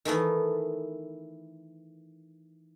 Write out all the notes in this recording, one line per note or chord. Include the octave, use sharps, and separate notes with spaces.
D#3 E3 A3 B3